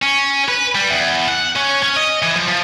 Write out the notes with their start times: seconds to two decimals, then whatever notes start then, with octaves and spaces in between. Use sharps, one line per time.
0.02 C#4
0.48 B4
0.75 G3
0.90 E2
1.28 F#5
1.56 C#4
1.83 C#4
1.97 D#5
2.22 E3
2.36 F3
2.47 F3